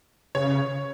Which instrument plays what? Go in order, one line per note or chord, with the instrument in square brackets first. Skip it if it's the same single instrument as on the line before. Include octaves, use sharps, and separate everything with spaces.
[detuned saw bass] C#3 [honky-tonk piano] C#5